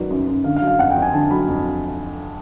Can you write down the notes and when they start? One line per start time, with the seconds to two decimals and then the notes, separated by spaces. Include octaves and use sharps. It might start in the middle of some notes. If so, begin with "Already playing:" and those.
Already playing: F#2 D#3 F#3 B4 D5
0.10 F#2
0.27 F#2
0.44 D3 F5
0.56 F5
0.61 F#3
0.67 F5
0.79 F2 F#5
0.90 G5
0.96 F2
1.02 G#5
1.13 D3 A5
1.31 F#3 B5
1.48 F2